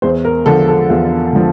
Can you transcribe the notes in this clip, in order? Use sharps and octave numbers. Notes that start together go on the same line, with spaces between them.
E2 C5
A#4
D3 F3 A4
A4
E2 F4
D3 F3